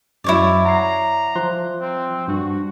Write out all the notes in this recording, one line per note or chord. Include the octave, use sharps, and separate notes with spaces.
F#2 F#3 E4 C#5 D5
F#5 A#5 C7
F3 C6 F#6
C4
G2 F#4